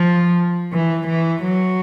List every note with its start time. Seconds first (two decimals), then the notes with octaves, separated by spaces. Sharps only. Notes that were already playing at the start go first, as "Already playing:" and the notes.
Already playing: F3
0.73 E3
1.07 E3
1.42 F#3